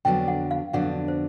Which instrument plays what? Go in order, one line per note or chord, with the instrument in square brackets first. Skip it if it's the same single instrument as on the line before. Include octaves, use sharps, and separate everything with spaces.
[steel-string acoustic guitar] F2 D3 F#3 B3 D4 [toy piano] G5
[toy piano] F#5
F5
[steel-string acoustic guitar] F2 D3 F#3 B3 D4 [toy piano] F#5
[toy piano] C5